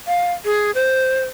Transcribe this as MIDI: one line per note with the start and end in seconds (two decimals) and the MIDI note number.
0.07 0.33 77
0.45 0.71 68
0.75 1.23 72